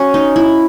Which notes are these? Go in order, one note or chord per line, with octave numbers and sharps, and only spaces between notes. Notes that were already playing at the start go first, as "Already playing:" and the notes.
Already playing: C#4 F#4
D#4
E4